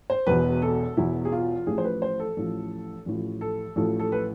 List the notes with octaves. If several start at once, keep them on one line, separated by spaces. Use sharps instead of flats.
C5
E1 E2 B2 B4
A4
E1 E2 B2 E4
G#4
F4
A1 A2 F3 G#4
C5
B4
C5
A4
A1 A2 F3
A1 A2 F3
A4
A1 A2 F3 A4
A4
B4